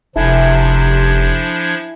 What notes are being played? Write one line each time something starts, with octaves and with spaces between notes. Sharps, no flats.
F1 C3 F3 D4 E4 A4 G#5 G#6